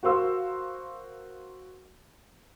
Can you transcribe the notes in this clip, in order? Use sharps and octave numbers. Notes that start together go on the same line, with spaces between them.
F#4 A#4 C5 F5 C6 E6